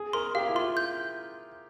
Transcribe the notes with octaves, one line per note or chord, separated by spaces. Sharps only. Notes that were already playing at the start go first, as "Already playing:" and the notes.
Already playing: G#4
A#4 C6
G4 F5
E4
F4 C6
G6